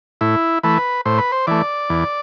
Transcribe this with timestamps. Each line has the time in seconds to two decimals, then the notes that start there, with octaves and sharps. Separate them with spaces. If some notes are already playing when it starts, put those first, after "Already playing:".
0.21 A2 E4
0.63 E3 A3 B4
1.05 A2 C5
1.18 B4
1.32 C5
1.47 E3 A3 D5
1.90 E2